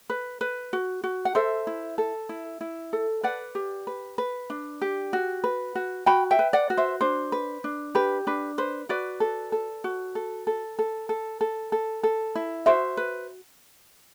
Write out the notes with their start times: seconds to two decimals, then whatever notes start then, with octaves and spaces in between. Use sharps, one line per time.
0.10 B4
0.41 B4
0.73 F#4
1.04 F#4
1.25 F#5
1.35 A4 C5 E5
1.67 E4
1.98 A4
2.29 E4
2.61 E4
2.93 A4
3.23 B4 D5 F#5
3.55 G4
3.87 B4
4.18 B4
4.50 D4
4.81 G4
5.13 F#4
5.44 B4
5.75 F#4
6.06 F#4 G5 B5
6.31 E5 G5
6.39 B4
6.53 D5 F#5
6.70 F#4
6.77 C5 E5
7.01 D4 C5
7.32 B4
7.64 D4
7.95 G4 B4
8.27 D4 B4
8.58 B4 C5
8.89 F#4 B4 D5
9.20 A4
9.52 A4
9.84 F#4
10.15 A4
10.47 A4
10.79 A4
11.09 A4
11.41 A4
11.72 A4
12.03 A4
12.35 E4
12.66 F#4 C5 E5
12.97 B4